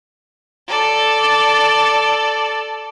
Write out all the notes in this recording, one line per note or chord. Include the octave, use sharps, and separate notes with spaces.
A4 D5